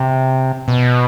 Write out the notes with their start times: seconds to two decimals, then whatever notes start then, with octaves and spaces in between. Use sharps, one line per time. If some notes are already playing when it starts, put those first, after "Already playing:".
Already playing: C3
0.68 B2